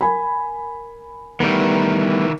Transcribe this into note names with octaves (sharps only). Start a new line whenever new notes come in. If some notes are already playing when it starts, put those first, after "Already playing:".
A#4 G#5 B5
D#3 E3 G3 A3 B3